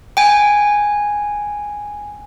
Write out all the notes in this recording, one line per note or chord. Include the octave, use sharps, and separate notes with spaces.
G5 G#5